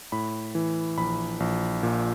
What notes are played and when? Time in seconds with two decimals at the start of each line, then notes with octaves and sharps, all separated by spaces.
0.12 A2 B5
0.55 E3
0.98 A#1 B5
1.40 A#1
1.83 A#2